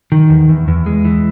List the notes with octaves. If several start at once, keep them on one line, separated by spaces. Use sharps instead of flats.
D#3
E2
E2
E2
G#3
E3